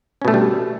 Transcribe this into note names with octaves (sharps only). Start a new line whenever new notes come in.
B2 D3 G3 A3 C#4